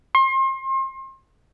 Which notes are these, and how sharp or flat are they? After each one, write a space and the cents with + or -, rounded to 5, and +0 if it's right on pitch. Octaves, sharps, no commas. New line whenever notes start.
C6 +35